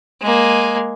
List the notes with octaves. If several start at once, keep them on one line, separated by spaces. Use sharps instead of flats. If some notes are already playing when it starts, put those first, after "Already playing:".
G#3 A#3